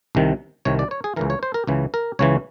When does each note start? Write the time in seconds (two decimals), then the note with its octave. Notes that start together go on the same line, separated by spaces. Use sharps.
0.15 C2 C3 D#3
0.65 C2 C3 D#3 C#5
0.79 D5
0.91 C#5
1.04 G#4
1.16 C#2 C#3 E3 A#4
1.30 C#5
1.43 C5
1.54 A#4
1.67 C#2 C#3 E3
1.94 A#4
2.19 C#2 C#3 E3 C#5